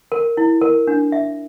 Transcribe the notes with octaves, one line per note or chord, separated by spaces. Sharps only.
A#4
E4
A#4
D4
E5